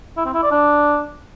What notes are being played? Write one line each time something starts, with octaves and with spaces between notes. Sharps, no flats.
E4
C4
E4
D5
D4